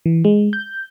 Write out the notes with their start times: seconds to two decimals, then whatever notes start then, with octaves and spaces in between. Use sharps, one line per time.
0.06 E3
0.25 G#3
0.53 G6